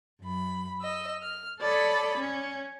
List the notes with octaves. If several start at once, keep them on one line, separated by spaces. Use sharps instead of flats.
F#2 B5
D#5 E6
F6
A4 C#5 D5 B5 D#6
C#4